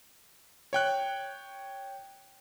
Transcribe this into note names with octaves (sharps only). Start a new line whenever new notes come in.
C#5 G5 F#6